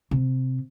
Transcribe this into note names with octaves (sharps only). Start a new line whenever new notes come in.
C3